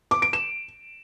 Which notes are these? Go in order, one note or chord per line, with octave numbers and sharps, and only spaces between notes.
D6
D7
E7